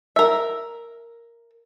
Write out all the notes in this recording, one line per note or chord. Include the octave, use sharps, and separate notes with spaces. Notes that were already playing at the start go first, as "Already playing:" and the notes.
A#4 E5